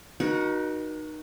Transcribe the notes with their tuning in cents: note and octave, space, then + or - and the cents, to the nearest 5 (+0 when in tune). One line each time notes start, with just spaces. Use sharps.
D#4 -15 F#4 +0 A#4 +40